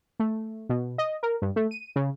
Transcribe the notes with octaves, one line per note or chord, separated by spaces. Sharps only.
A3
B2
D#5
A#4
G2
A3
D#7
C#3